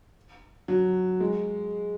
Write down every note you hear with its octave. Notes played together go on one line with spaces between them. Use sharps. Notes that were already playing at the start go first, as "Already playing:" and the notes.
F#3
G#3